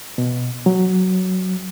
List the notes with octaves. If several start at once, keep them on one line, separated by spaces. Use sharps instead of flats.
B2
F#3